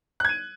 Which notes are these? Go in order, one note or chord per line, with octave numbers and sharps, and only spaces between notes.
F#6 G#6 D#7